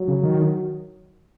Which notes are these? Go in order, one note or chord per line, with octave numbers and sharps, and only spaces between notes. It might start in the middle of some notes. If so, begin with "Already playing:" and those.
Already playing: F#3
C#3
D#3